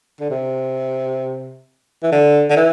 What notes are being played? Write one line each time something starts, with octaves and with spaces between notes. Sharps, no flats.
D3
C3
E3
D3
D3
E3